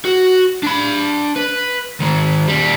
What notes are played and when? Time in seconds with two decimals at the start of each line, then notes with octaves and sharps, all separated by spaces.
0.05 F#4
0.63 D4 B5
1.36 B4
2.00 D#3 G#3
2.48 D#2 G3